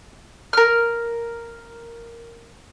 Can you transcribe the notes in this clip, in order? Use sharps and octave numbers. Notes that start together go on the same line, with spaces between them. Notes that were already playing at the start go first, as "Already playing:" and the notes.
A#4 F6